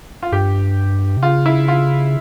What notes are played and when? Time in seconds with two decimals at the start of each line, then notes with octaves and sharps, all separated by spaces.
0.23 F4
0.32 G2 G4
1.17 C3
1.23 C#3 F4
1.46 E4
1.68 F4